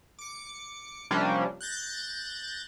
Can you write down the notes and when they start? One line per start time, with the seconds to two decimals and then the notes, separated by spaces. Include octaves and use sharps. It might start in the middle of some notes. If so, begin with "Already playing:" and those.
0.19 D6 C#7
1.11 C3 F3 G3 A#3 C#4 D4
1.61 F#6 G6 A6 A#6